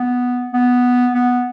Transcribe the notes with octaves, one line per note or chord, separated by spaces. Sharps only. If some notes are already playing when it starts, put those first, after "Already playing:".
Already playing: B3
B3
B3